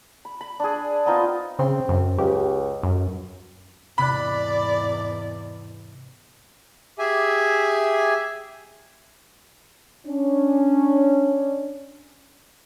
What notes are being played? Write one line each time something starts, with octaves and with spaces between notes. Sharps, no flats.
B5
B5
D4 G#4
B3 C4 D#4 F4
C#3 C4
F#2
C#2 G4
F#2
E2 G#2 C3 D5 B5 F#6
G4 G#4 E5 G#5
C#4 D4